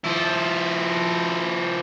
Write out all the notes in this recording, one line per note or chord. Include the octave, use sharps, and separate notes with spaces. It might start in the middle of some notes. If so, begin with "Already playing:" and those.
F3 E4